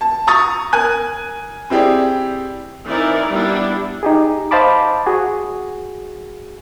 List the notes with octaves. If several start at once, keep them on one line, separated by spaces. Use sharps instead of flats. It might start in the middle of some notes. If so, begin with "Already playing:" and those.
A5
A#5 C#6 D#6 A6
A#4 G#5 F#6
C4 E4 G4 G#4 D5
E3 C4 D#4 E4 A#4 D5
G3 B3 D4 E4
D#4 G4 G#4
C5 D#5 F5 A5 B5 D6
F#4 G#4